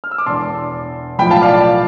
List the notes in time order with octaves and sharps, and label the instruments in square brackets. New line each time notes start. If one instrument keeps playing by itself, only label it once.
[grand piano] F6
E6
D6
E1 E2 D3 A5 C6
B1 A2 F3 G5 B5
F5 A5
D5 F5
D5